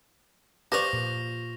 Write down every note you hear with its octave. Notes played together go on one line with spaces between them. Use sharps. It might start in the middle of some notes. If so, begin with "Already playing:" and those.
G4 B4 C5 D5 F5 C#6 A#6 F7
A#2